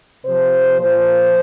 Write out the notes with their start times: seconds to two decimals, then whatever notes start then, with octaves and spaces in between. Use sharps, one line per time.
0.24 C3 F3 C5
0.79 A#2 F3 C5